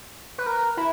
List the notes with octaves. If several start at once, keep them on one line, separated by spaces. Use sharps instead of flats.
B4
A#4
E4